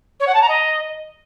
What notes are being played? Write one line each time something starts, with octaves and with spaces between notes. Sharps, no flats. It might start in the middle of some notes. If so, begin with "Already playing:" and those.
C#5
F#5
A5
A#5
D#5